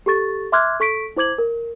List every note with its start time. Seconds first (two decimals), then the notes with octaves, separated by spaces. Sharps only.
0.06 G4 A4 C#6 A6
0.52 E5 C6 D6 F6 F#6 G#6
0.80 A4 C#6 B6 D7
1.17 E4 C5 D6 G#6 F#7
1.38 A#4